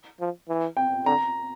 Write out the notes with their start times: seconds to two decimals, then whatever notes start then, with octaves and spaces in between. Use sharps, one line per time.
0.20 F3
0.48 E3
0.77 G5
1.06 D3 A#5